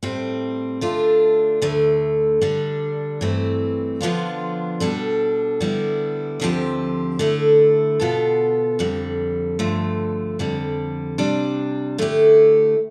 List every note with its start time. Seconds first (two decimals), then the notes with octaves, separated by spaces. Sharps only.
0.03 A2 G3 C4
0.81 D3 A3 D4 F4
1.62 D2 D3 A3
2.41 D3 G3 D4
3.21 G2 E3 A3 C4
4.01 D3 F3 B3 D4 F4
4.80 B2 G3 D4 A4
5.60 D3 G3 B3 E4
6.40 D2 D3 F3 C4 G4
7.19 D3 A3 E4
8.00 B2 B3 F4 A4
8.79 F2 D3 G3
9.59 G2 D3 F3 A3
10.39 F2 D3 G3
11.18 C3 G3 D4
11.98 D3 A3 E4 G4